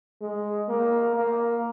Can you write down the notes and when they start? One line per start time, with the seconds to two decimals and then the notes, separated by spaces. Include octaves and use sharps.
0.21 G#3
0.69 A#3
1.16 A#3